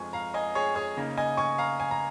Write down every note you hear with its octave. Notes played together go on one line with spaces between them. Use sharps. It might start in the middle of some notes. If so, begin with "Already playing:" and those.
Already playing: F2 F3 G#3 G#5 C#6
F5 A#5
D#5 G#5
G#4 C#5
G#4 C#5
C#3 A#3 D#4
D#5 G#5
G#5 C#6
F5 A#5
G#5
A#5